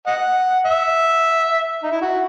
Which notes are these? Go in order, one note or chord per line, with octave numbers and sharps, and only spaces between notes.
D#5 F#5
E5
D#4
E4
F#4